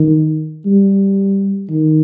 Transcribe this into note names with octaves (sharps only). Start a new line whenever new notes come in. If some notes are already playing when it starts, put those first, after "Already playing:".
Already playing: D#3
G3
D#3